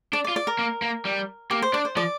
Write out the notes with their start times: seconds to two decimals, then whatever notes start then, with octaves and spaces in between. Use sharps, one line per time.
0.13 D4 D5
0.24 D5
0.28 F4
0.36 D5
0.47 A#4
0.59 A#3
0.82 A#3
1.05 G3
1.51 A#3 G4
1.62 C5
1.73 D4 D5
1.85 C5
1.96 F3 D5